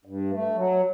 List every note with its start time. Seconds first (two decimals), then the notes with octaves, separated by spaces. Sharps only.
0.05 G2
0.31 A3
0.56 F#3